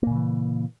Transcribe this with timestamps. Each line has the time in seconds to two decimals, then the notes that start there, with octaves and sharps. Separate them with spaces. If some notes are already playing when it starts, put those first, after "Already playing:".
0.03 A#3
0.07 A#2
0.11 C#3
0.15 E3